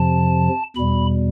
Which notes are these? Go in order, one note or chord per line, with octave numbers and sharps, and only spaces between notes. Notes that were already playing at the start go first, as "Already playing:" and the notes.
Already playing: F2 C3 F3 A5
E2 B2 G3 B5